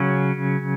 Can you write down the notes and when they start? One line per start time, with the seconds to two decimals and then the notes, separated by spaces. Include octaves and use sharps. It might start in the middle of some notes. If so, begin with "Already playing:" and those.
Already playing: C#3 F#3 C#4